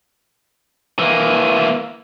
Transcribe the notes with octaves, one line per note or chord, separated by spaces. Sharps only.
E3 A#3